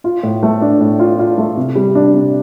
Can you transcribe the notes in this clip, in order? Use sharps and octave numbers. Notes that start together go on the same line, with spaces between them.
F4
A2
A3
D4
A2
F4
F4
A3
C3
G3
D4
C3